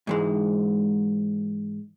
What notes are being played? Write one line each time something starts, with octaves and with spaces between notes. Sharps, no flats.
G#2 E3 G#3